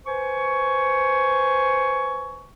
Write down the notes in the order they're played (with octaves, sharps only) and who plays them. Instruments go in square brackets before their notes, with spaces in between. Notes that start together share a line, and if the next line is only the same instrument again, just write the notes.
[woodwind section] B4 C5 G#5 C#6